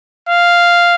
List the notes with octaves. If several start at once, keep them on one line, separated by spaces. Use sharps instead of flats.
F5